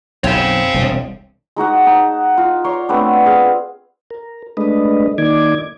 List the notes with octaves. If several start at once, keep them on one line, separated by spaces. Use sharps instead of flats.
B1 F#2 C4 C#5 F5
E1 C2
G#3 D#4 F#4 F#5
D#4 A5
F4
C#5 D5 A#5 C6
A3 B3 C4 D4
G#4 F5
A#4
G#3 A3 D4 B4 D#5
D#3 A#3 D#4 D5 D6 G#6